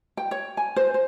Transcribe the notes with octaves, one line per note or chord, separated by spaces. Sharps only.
G5
C#5
G#5
C5
C5